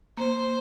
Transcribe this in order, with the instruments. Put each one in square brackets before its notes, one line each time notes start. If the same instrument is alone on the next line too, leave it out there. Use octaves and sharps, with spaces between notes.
[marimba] A#3 [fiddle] C5